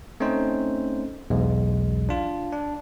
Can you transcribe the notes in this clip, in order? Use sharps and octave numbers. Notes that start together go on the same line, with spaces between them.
A3 C4 C#4 D#4 C5
B1 E2 G#3
D4 F4
D4